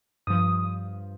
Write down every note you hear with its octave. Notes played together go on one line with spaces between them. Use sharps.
G2 F3 D#6